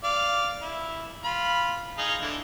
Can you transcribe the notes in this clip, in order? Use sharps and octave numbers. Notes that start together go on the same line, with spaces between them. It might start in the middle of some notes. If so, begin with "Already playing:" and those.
D5 F5
E4
F4 B5
D#4 G#4 F5
D3 E3